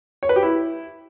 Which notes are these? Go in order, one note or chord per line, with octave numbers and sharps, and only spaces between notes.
C#5
B4
G4
E4